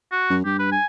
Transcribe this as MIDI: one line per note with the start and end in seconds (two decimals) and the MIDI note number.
0.12 0.35 66
0.30 0.41 42
0.45 0.76 43
0.45 0.57 67
0.59 0.68 71
0.72 0.86 80